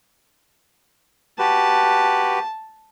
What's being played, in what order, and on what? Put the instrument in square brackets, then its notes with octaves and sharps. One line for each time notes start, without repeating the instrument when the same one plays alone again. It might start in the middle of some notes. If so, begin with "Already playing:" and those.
[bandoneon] F#4 G4 B4 [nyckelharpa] A5